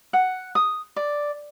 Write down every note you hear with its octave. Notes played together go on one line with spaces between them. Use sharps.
F#5
D#6
D5